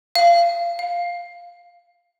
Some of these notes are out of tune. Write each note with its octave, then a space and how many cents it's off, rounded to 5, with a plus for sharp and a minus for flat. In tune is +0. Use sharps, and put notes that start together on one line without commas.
F5 -25
F5 +0